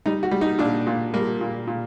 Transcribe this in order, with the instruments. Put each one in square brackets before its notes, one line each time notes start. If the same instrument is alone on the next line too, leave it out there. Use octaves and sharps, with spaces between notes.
[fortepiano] G3 D#4
F#4
G3
D#4
A#2 D4
A#2
G3 A#3
A#2
A#2